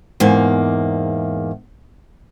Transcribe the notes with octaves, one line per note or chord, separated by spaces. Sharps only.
E2 G#2 A#3